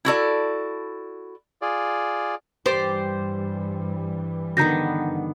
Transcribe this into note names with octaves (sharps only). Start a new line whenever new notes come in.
E4 F#4 A4 D5
F4 G#4 D5
G2 E3 G3 G4 C5 D5
D3 D#3 B3 A#5 G6 A#6